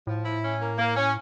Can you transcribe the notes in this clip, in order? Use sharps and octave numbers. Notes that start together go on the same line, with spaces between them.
A2 F3
E4
C#4
A#3
A#3
C#4